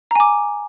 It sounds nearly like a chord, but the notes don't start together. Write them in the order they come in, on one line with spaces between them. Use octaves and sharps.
A#5 G#5 D6